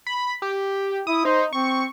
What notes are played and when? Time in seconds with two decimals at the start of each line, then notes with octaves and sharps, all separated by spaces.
0.07 B5
0.42 G4
1.07 E4 D#6
1.25 D#4 C5
1.53 C4 C#6